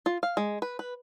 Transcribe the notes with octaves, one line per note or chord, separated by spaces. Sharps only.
F4
F5
G#3
B4
B4